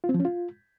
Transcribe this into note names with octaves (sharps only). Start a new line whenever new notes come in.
F4
C4
F3
C#4
F4